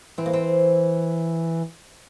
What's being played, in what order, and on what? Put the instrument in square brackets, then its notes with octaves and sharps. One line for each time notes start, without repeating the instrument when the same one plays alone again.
[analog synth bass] E3 [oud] C4
[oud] A#3
C4